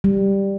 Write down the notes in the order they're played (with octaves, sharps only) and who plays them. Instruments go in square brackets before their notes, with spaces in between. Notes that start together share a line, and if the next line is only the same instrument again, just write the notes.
[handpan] G3